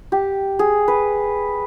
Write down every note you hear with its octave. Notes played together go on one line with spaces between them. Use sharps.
G4
G#4
B4